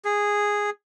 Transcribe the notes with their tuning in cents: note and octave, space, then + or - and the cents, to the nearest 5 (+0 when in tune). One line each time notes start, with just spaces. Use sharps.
G#4 -10